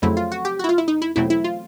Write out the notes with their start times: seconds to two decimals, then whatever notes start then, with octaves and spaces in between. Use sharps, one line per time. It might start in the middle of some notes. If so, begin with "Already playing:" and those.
0.02 F2 C#3 F#3 A3 C4 E4
0.17 F4
0.32 F#4
0.45 G4
0.59 E4 F#4
0.69 F4
0.78 E4
0.88 D#4
1.02 E4
1.16 E2 B2 F#3 A3 C4 E4
1.30 E4
1.44 F4